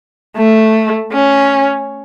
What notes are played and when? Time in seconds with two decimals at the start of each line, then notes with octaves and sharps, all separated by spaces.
0.37 A3
1.13 C#4